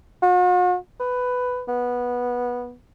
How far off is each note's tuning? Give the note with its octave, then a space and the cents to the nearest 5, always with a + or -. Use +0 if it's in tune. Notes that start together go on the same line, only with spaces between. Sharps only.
F#4 -45
B4 +10
B3 -15